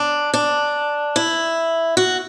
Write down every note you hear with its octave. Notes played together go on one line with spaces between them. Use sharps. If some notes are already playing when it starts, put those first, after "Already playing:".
Already playing: D4
D4
E4
F#4